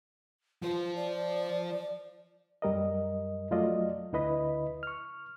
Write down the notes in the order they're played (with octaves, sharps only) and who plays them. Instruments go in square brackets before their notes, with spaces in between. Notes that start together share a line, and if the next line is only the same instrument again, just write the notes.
[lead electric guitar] F3 C5 [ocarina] F4
[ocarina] D5
[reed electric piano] F#2 G3 A#4 D#5
F2 F#3 A3 F4 D5 D#5
D2 D3 E4 B4 D#5 B5
C#6 F6